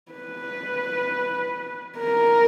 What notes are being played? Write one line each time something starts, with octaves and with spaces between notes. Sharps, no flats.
B4
A#4